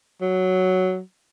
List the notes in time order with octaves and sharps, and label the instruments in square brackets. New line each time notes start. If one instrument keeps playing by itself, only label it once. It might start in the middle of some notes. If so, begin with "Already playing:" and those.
[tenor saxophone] F#3